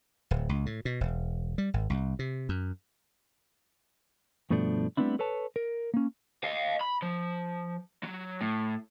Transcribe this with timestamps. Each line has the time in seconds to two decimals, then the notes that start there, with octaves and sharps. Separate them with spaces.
0.31 D1
0.49 C#2
0.66 A2
0.85 B2
1.01 E1
1.58 G3
1.74 G#1
1.90 C2
2.19 C3
2.49 F#2
4.50 G2 B2 F3 A3 D4
4.97 G3 A3 B3 C4 D4 E4
5.19 A4 B4 C#5 A5
5.56 A#4
5.94 A#3 C#4
6.44 D#5 F5
6.81 B5
7.02 F3
8.03 F#3
8.41 A2